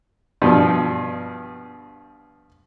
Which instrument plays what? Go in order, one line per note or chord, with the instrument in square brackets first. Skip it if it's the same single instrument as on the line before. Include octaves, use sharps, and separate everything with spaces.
[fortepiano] G2 B2 F3